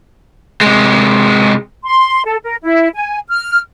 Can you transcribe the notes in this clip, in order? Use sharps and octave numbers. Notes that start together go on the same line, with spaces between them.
C3 G#3
C6
A4
A#4
E4
G#5
F6